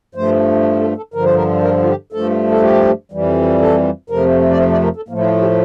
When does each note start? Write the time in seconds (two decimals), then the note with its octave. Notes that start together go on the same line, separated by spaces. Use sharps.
0.15 G2 F3 A3 C5
0.81 A4
0.97 A4
1.14 G2 D3 F3 A#4
1.24 C5
1.35 A#4
1.62 A#4
1.82 F4
1.88 G4
2.12 G2 F3 A3 A4
2.51 A4
2.62 G4
3.12 F2 E3 G3
3.61 A4
4.10 F2 C3 F3 A3 A#4
4.50 D5
4.59 C5
4.72 D5
4.83 A#4
4.96 A4
5.08 A2 F3 A3 A#3
5.18 E4
5.24 F4
5.41 G4